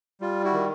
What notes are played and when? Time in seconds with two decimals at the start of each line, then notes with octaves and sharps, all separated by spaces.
0.21 G3 F4
0.44 E4 F#4
0.53 D#3